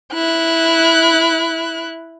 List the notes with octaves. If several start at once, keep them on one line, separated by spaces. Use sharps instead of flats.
E4 F#6